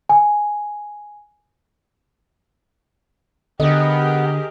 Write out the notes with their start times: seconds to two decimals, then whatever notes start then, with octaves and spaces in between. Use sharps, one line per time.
0.09 G#5
3.60 D3 B3 G4 G#4 A#4 D#5